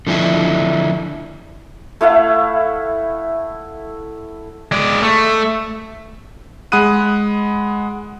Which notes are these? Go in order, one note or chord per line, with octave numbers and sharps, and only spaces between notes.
D3 F3 D4 E4
A3 E4 F5 F#5
G#3 D5
A3
G#3 F#5 B5 D#6 F#6 D#7